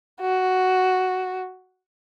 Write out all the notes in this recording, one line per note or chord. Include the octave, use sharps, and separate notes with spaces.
F#4